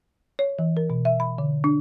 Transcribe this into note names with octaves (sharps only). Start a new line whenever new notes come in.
C#5
E3
A#4
B2
E5
B5
D3
D4